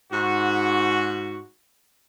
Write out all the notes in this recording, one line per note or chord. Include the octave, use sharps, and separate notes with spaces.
G#2 F#4